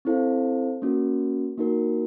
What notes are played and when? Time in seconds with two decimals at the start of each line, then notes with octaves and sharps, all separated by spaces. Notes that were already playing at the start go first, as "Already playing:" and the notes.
0.05 C4 E4 A4 C5 F5
0.82 A#3 C#4 F#4 A#4
1.58 A#3 D#4 F#4 A#4